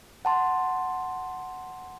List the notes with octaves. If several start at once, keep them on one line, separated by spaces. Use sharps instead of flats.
F#5 A5 C6